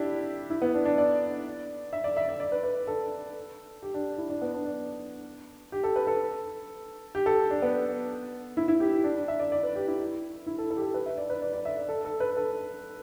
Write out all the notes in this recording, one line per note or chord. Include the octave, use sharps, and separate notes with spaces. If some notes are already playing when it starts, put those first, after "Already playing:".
Already playing: D4 E4 G4
E4
B3
D4
D4
D5
E5
D5
E5
D5
D5
B4
B4
A4
G4
D4
E4
D4
B3
D4
D4
G4
A4
B4
A4
G4
A4
D4
B3
E4
E4
G4
D4
D4
E5
D5
D5
B4
G4
E4
E4
A4
A4
G4
A4
B4
E5
D5
B4
D5
D5
E5
D5
A4
A4
B4
A4